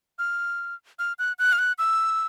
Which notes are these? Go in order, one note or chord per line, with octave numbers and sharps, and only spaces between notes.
F6
F6
F#6
F#6
F6
F#6
E6